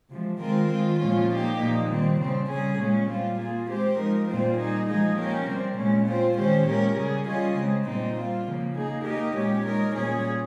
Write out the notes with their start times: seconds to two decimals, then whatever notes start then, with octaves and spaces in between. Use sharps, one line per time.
0.10 C3 F3 G#3
0.39 D#3 G#3 C4 F4 A#4
0.70 D#3 G#3 C4 F4
0.99 A#2 F3 G#3 C#4 F4
1.29 A#3 D#4 G4
1.60 A#2 F3 A#3 D#4
1.89 D#3 G3 C4
2.19 C#3 G3 C4
2.48 C#3 G3 C#4 G#4
2.79 A#2 G#3 C#4
3.08 A#2 G3 C4 F4
3.38 A#3 F4 G#4
3.69 G#3 C4 G4 C5
3.98 F3 G#3 D#4 A#4
4.27 A#2 G3 C4 F4 C5
4.57 G3 A#3 D#4 G#4
4.88 F3 G#3 D#4 G#4 D#5
5.18 A#3 C#4 G4 A#4
5.47 C3 G3 C4
5.78 A#2 G#3 C#4
6.07 C4 F4 C5
6.36 D#3 G#3 C#4 G4 C5
6.66 A#2 G#3 C#4 G4 A#4
6.97 C#3 G3 C#4 G#4
7.26 G3 C#4 F4 G#4 D#5
7.56 C#3 G#3 C4
7.86 A#2 G3 C4 D#4
8.16 G3 C4 F4
8.46 C#3 F3 A#3
8.76 A#3 D#4 G#4
9.05 A#3 D#4 G4 A#4 D#5
9.36 A#2 G#3 C#4 G4 C#5
9.65 G#3 D#4 A#4 C#5
9.95 A#2 G3 C#4 G#4 C#5